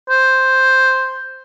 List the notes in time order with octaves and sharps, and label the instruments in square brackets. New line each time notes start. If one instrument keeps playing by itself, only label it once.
[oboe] C5